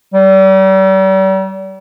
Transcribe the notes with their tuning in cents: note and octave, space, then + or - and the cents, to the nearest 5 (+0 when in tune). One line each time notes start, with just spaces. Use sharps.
G3 -40